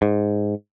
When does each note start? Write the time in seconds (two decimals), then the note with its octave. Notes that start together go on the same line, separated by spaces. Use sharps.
0.02 G#2